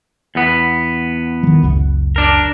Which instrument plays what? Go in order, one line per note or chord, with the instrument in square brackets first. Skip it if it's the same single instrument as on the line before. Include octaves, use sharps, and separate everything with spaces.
[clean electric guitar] E2 B3
[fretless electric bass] D#3 F#3
F#1 C#2 F#2
[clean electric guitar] D4 A#4